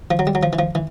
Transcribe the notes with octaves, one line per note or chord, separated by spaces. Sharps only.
F3
F#3
G3
F#3
F3
E3
F3
E3